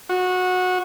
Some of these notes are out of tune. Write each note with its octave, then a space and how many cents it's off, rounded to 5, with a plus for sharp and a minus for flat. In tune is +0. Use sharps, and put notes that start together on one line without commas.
F#4 -20